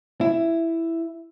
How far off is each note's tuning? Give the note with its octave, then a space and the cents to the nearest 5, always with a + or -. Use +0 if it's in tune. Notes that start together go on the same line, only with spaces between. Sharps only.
E4 +5